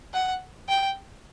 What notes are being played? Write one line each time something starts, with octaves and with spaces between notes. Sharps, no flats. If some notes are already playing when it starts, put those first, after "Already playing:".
F#5
G5